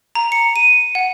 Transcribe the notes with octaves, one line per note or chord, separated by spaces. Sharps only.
A#5
C#7
D#7
F#5